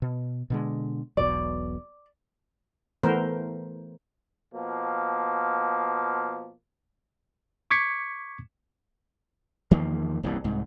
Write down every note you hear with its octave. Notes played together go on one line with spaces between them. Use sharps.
B2
B2 D3 G#3
E1 B1 B2 D5
E3 A3 B3 A#4 C5
B2 F3 A#3
C#6 D6 G#6 B6 C#7
E2 D#3 F3 A#3
D#1 C2 G2 E3
C2 G#2